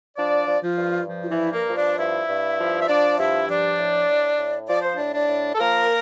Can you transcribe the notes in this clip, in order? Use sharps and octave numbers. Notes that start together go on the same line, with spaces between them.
F3 D4 D5
F3
F3 F4
G2
F3
F4
E3 E4
G2
A#3 A#4
F3
D4 D5
G2 E4 E5
G2
F3
E5
F3 D4 D5
G2 E4 E5
F3 D4 D5
A2
A2
A2
F3 D5
C5
A2 D4 D5
D4 D5
A2
A4
F3 A#3 A#4